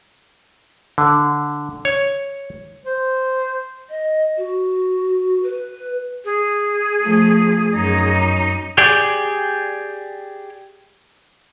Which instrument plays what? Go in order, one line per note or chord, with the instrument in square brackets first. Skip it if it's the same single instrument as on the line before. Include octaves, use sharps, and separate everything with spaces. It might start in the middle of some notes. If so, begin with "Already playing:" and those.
[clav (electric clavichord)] D3
C#5
[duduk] C5
[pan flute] D#5
F#4
B4
[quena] G#4
[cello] F3 A3
F#2 D#4
[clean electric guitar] G4 G#4 D5 G5